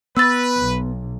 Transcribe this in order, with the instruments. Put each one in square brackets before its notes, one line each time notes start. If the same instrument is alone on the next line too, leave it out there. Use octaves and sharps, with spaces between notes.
[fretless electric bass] B3 [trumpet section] B4 [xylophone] E6 A6
[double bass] B1